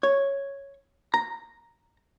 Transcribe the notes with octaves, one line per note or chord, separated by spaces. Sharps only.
C#5
A#5